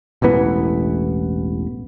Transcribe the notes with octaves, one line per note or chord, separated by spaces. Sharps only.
E1 A1 E3 B3